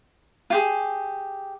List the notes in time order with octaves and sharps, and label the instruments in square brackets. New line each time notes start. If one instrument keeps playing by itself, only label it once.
[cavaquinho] F4 G4 G#4